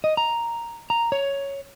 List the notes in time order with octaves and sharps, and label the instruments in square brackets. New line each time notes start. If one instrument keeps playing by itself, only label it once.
[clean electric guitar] D#5
A#5
A#5
C#5